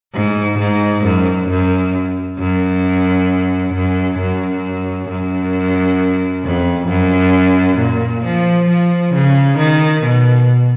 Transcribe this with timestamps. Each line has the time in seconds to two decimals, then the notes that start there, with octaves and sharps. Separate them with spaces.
0.14 G#2
0.59 G#2
1.05 F#2
1.49 F#2
2.39 F#2
3.74 F#2
4.19 F#2
5.09 F#2
6.44 F2
6.88 F#2
7.78 A#2
8.24 F3
8.69 F3
9.14 C#3
9.58 D#3
10.03 B2